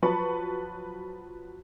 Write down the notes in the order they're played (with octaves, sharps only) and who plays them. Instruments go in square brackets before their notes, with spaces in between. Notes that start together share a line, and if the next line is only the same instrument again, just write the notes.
[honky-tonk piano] F3 F#3 B4 A5 C#6